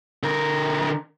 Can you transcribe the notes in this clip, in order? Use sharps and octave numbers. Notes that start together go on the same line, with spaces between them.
D3 A#4